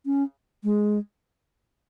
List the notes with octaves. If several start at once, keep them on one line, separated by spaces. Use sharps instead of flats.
C#4
G#3